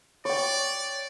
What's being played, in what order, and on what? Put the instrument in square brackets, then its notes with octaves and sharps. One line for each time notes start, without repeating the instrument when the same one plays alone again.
[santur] C#5 G5 [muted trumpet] D5